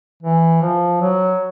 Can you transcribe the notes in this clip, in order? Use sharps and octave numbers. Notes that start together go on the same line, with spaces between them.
E3
F3
F#3